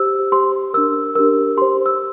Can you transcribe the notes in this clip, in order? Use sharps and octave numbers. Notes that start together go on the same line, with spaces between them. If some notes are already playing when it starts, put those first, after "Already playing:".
Already playing: G4 C5 E6
G4 C5 C6
D4 G4 A#4 E6
D4 G4 A#4 E6
G4 C5 C6
E6